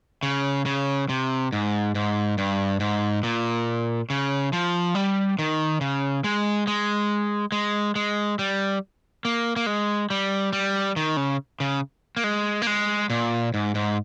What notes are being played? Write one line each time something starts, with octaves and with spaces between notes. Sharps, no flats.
C#3
C#3
C3
G#2
G#2
G2
G#2
A#2
C#3
F3
G3
D#3
C#3
G#3
G#3
G#3
G#3
G3
A#3
A#3
G#3
G3
G3
D#3
C#3
C#3
A#3
G#3
A#3
G#3
A#2
G#2
G#2